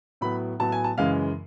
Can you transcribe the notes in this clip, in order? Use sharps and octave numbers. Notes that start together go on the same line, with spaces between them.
A2 F#3 B3 B5
A2 F#3 B3 A5
G#5
A5
F#2 C#3 E3 G#3 F5